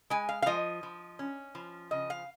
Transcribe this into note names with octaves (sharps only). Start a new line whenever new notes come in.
G#3 G#5
F5
F5
F3 D#5
F3
C#4
F3
C#3 D#5
F5